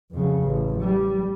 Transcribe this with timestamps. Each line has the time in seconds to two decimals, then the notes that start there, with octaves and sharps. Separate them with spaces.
0.12 F2 C#3
0.42 A1
0.81 G3